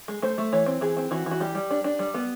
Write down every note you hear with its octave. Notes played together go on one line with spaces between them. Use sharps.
G#3
A3 C5
A3
E3 C#5
C4
E3 G#4
C4
E3 F#4
E3
F#4
G3 G4
G3
D4
D4
G3
B3